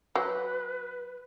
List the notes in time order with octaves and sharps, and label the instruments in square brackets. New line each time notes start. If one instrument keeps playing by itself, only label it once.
[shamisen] F#3 [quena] B4